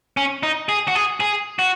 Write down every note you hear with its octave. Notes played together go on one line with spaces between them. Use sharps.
C#4
D#4
G#4
F#4
G#4
G#4
F#4